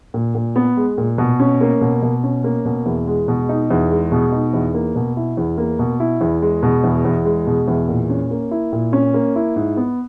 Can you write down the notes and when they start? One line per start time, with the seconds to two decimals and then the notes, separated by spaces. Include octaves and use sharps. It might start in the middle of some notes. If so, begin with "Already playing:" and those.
0.14 A#2
0.35 A#2
0.56 B3
0.77 G#3
0.98 A#2
1.18 B2
1.40 C#4
1.61 A#3
1.81 B2
2.03 B2
2.23 C#4
2.44 A#3
2.65 B2
2.86 E2
3.07 G#3
3.28 B2
3.49 D#4
3.70 E2
3.91 G#3
4.12 B2
4.32 D#4
4.54 E2
4.74 A#3
4.96 B2
5.17 E4
5.37 E2
5.58 A#3
5.79 B2
6.00 E4
6.21 E2
6.42 G#3
6.63 B2
6.84 E2
7.05 E2
7.25 G#3
7.47 B2
7.68 E2
7.88 A#2
8.10 C#4
8.31 A#3
8.51 E4
8.73 A#2
8.93 C#4
9.14 A#3
9.36 E4
9.56 G#2
9.77 B3